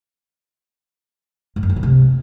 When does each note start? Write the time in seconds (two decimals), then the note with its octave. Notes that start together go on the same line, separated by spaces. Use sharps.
1.56 G2
1.63 F#2
1.70 F3
1.76 A#2
1.83 C3